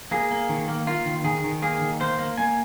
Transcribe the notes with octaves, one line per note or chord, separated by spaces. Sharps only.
A#3 G#4
A#3
D#3
A#3
A#3 F4
D#3
D#3 G#4
D#3
A#3 G#4
D#3
A#3 C5
A#3
A#3 G#5